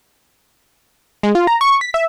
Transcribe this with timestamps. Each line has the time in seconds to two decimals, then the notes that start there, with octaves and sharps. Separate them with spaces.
1.23 G#3
1.35 F4
1.47 A#5
1.61 C#6
1.81 B6
1.94 E5